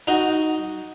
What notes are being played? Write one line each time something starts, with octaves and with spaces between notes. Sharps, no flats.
D#4 F#4